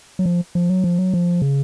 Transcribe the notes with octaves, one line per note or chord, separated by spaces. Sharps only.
F#3
F3
F3
F#3
F3
F#3
F3
C#3